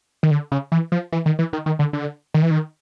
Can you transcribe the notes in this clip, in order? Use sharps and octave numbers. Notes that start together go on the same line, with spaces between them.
D#3
D3
C#3
E3
F3
E3
D#3
E3
D#3
D#3
D3
D3
D#3
E3
D#3